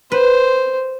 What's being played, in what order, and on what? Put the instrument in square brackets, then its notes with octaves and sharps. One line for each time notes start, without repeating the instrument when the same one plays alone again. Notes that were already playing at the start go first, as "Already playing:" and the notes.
[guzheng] B4 [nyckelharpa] C5